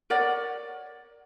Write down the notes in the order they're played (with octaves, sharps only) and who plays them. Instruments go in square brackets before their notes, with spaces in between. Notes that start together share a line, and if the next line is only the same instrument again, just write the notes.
[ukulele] A#4 C#5 D5 F#5